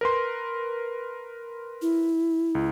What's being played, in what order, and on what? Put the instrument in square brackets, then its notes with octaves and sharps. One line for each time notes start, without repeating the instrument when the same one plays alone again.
[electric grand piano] A#4 B4 C6
[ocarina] E4
[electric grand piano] C#2